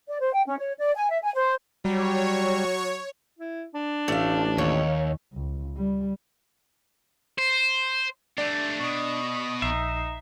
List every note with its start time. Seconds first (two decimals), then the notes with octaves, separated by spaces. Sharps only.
0.08 D5
0.21 C5
0.33 G5
0.47 C#4
0.59 C#5
0.79 D5
0.95 G#5
1.11 E5
1.23 G#5
1.35 C5
1.85 F#3 G3 C#5
3.39 E4
3.74 D4
4.08 A1 A3 F5
4.58 D#2 C#5
5.33 C#2
5.77 G3
7.38 C5
8.38 A3 D4 G4 D5
8.80 B2 D#5 C#6
9.62 A#1 D#4 E5 C7